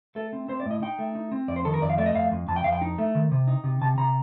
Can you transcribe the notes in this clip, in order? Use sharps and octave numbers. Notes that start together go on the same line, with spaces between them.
A3 A4
C4
C4 C5
D5
A2 D#5
D#4 G5
A3
D#4
C4
F2 D5
C5
D#3 A4
A#4
F2 D5
F5
A3 D5
D#5
F2 F5
F2
F2 A5
G5
F2 F5
G5
D#4
A3
D#3
C3
D#4
C3
C3 A5
C3 A#5